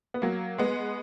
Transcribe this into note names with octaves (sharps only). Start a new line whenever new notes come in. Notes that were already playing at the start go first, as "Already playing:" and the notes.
B3
F#3 A#3
G#3 B3